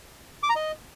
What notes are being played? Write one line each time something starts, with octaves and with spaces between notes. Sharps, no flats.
D6
A#5
D#5